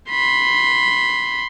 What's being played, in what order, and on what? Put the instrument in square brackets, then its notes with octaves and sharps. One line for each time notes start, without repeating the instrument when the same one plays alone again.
[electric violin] B5 C6